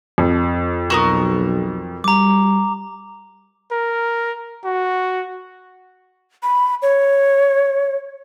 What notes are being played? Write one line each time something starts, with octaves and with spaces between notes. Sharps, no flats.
F2
B1 F#4 A#4 D#6
G3 A#5 D6
A#4
F#4
B5
C#5